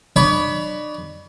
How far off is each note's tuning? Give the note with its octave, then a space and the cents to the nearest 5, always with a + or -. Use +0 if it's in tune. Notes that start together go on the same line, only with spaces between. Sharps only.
D4 +40 C#5 +40 B5 +0